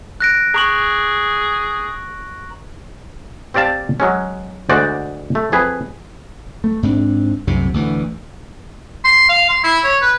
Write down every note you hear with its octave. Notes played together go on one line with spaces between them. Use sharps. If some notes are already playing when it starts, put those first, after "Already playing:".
F#6 A#6 D7
G#4 A#5 C#6 F#7
C4 G4 D5 F5 A5
F#3 G#3 C#4
D2 G#3 F#4 C5 D5
A3
F2 G#4 B4
A3
G#2 C4 D4
C2 F#2 A2 C3
D2 A2 E3
C6
F5
C6
E4
C#5
B4